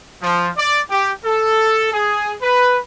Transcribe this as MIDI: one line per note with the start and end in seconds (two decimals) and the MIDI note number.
0.22 0.49 53
0.57 0.80 74
0.90 1.11 67
1.24 1.88 69
1.93 2.34 68
2.42 2.78 71